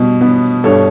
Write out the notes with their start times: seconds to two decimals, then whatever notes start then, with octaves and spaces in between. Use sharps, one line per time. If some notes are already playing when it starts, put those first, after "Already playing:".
Already playing: B2 G3
0.21 B3
0.64 G2 A4 C#5